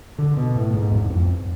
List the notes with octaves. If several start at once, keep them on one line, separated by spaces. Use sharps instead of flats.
D3
B2
A2
G#2
E2
F2